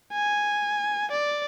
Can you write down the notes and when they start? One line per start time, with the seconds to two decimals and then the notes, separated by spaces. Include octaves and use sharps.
0.13 G#5
1.11 D5